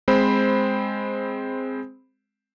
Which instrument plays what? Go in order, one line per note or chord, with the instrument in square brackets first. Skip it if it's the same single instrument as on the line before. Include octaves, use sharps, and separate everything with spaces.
[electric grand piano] G#3 C4 C5 B5